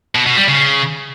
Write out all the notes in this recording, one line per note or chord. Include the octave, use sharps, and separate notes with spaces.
B2
B2
G3
C#3